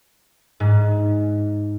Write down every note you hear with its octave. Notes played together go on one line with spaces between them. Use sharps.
G#2